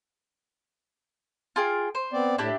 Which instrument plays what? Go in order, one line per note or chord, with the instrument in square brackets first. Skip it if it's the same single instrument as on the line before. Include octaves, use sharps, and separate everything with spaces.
[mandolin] F4 G#4 G5
C5
[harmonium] B3 C4 D5
[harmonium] A2 [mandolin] D4 E4 G4